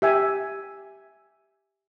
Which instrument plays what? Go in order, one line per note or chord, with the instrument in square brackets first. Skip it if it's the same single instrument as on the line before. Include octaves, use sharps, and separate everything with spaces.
[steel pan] G4 E5 G#5